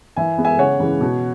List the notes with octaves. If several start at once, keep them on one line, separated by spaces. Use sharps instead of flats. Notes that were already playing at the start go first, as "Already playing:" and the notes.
E3 E5 G#5
G#3 B3
E5 G#5
C#3 C#5 F#5
E3 G#3 C#4
B2